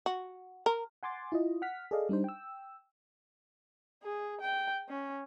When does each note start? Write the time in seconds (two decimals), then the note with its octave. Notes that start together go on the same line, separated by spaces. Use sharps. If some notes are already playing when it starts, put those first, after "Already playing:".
0.06 F#4
0.66 A#4
1.03 F#5 G#5 C6 D6 A6
1.32 E4 F4 D#5
1.62 F#5 F6 B6
1.91 G#4 A4 D5 D#5 F5
2.09 G3 D4 D#4 C5
2.24 G5 E6
4.03 G#4
4.41 G5
4.89 C#4